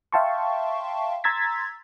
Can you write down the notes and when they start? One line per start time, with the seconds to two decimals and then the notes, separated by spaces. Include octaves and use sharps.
0.12 E5 F5 G5 A5 C6 C#6
1.24 A#5 C6 E6 G#6 A6 B6